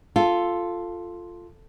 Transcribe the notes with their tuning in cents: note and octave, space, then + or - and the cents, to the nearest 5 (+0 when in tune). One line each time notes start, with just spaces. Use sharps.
F4 +0 A4 +0